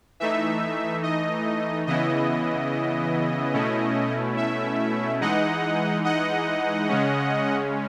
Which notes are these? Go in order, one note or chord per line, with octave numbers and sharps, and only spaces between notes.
E3 A3 D#4 E5
D#5
C#3 E3 B3 E4 D#5
B2 A3 C#4 E4
E5
E3 G#3 D#4 D#5 F#5
D#5 F#5
C#3 G#3 C#4